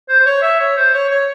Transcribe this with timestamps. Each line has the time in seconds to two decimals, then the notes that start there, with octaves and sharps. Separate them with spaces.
0.09 C5
0.20 C5
0.26 C#5
0.42 E5
0.60 C#5
0.77 C5
0.93 C#5
1.10 C#5